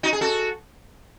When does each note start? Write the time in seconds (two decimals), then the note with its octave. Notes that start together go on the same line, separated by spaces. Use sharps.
0.03 D#4 F#4
0.13 G#4
0.21 F#4 A4